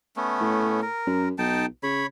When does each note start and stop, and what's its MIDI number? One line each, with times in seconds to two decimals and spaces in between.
0.16 0.81 57
0.16 0.81 59
0.16 0.81 61
0.41 0.83 45
0.82 1.29 70
1.07 1.32 42
1.38 1.66 35
1.38 1.66 63
1.38 1.66 79
1.38 1.66 81
1.83 2.05 49
1.83 2.06 73
1.83 2.06 83